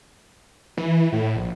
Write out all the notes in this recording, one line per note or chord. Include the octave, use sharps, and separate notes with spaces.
E3
A2
A#1